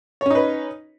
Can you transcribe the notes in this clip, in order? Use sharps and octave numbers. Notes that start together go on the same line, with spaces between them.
C#4 D#4 B4 C#5